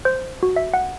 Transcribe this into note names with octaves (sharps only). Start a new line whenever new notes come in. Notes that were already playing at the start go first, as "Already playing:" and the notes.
C5
F#4
E5
F#5